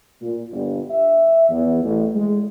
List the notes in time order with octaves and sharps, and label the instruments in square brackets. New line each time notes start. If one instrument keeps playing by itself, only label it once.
[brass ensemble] A#2
G1
E5
E2
A1
G#3